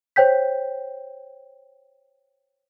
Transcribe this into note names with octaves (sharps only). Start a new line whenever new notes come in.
C5 C#5 G5 G6 B6